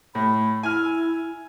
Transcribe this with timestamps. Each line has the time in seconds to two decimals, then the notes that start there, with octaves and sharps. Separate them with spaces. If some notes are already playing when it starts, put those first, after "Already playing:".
0.15 A2 B5
0.63 E4 G#5 F6